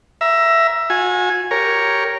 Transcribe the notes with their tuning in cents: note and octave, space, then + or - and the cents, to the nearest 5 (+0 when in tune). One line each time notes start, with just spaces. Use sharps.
E5 +15 A#5 +25
F#4 -40 G#5 +0
G4 +0 A#4 +0 C#5 +0